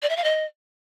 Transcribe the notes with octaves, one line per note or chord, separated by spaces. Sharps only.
D5
E5
F5
D#5